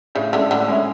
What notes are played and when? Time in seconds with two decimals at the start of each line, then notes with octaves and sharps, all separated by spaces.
0.15 A2 C#3
0.33 D3 G#3 C#4 E4
0.50 A2 D3
0.68 G#3 C#4 E4